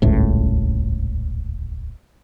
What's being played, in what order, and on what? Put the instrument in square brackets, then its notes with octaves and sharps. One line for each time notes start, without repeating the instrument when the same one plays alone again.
[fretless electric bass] D#1 G#1 C#2 A2